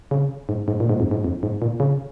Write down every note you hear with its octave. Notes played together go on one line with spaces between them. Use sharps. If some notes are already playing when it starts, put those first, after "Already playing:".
C#3
G#2
G#2
A#2
G#2
F2
G#2
F2
G#2
A#2
C#3